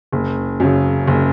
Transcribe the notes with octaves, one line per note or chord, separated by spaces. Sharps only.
F#1
F#2 C#3
F#1